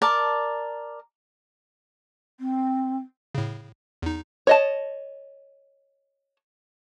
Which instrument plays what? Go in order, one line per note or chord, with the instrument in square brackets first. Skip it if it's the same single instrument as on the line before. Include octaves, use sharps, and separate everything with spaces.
[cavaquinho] A#4 D5 A5
[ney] C4
[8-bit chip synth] A2 C#3
E2 D#4
[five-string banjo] C#5 D#5 A5